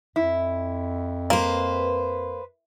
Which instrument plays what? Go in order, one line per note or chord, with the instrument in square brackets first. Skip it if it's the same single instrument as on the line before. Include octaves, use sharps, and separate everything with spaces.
[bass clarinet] F2 [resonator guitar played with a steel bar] E4
[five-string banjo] A#3 [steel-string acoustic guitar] B4 C5